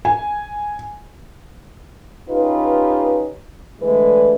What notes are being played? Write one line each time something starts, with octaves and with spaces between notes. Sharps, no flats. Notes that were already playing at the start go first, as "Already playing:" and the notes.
G#5
C#4 D#4 F4 G4 B4
D3 E3 G#3 A3 D4 B4